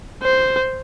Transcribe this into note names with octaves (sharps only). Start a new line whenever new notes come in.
C5